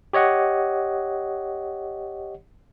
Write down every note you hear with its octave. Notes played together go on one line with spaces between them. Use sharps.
G4 C#5 D#5 F#5